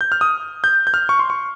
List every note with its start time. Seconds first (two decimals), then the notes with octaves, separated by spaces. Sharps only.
0.01 G6
0.12 F6
0.21 D#6
0.64 G6
0.87 G6
0.94 F6
1.09 C#6
1.19 C6
1.30 C#6